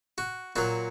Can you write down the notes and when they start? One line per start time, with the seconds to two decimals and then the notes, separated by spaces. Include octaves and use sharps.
0.18 F#4
0.56 A#2 F#3 F#4